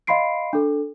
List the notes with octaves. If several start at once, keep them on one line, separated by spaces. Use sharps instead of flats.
D#5 F5 B5 C6 C7 D7
D4 A4